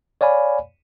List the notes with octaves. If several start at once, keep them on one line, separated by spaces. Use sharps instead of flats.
C#5 D5 F5 G#5 B5